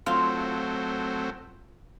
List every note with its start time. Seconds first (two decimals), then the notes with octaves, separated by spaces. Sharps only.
0.06 F#3 A3 C4 F4